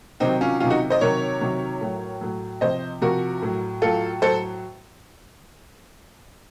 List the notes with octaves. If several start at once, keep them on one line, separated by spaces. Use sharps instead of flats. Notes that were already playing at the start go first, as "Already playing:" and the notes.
C3 D#3 F#3 C4 D#4
C#4 F4
C3 D#3 F#3 C#4 F4
D#4 F#4
C5 D#5
C3 D#3 F#3 A#4 C#5
C3 D#3 F#3
A2 F#3
A2 F#3
C3 F3 C5 D#5
C3 F3 F#4 A#4
A2 F#3
A2 F#3 F4 A4
A2 F#3 A4 C5